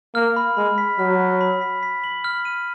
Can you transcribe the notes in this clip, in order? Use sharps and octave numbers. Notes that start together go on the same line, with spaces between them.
A#3 F6
B5
G#3 B5
B6
F#3 F6
B5
B5
B6
B6
F#7
F6
D#7